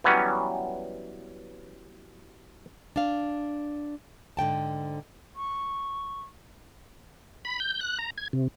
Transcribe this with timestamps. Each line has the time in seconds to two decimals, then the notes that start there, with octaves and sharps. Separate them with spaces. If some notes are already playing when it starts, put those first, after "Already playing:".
0.04 E3 F#3 G3 B3 C#4
2.96 D4 F5
4.37 G#2 D3 G5 A5
5.36 C#6
7.45 B5
7.60 G6
7.81 F#6
7.99 A#5
8.18 G#6
8.33 C3